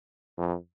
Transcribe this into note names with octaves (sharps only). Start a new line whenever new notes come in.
F2